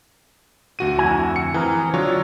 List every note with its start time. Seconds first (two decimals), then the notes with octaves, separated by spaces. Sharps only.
0.79 D2 F#4 D#7
0.99 F2 E4 G#5
1.36 C#7
1.54 E3 C4 G#4 A#4
1.94 D3 F#3 F4 C#5